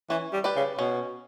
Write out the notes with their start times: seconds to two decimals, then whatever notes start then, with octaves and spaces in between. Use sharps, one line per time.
0.10 E3 C#4
0.33 G3
0.44 G4 B4 D5
0.56 C#3
0.79 B2 C#4